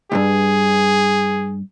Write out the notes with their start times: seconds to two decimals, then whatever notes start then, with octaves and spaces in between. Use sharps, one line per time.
0.12 C2 G2 G#4